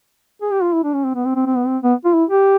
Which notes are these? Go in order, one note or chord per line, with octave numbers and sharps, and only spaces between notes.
G#4
G4
F4
E4
D4
C#4
C4
B3
C4
C4
C4
B3
C4
B3
F4
E4
G4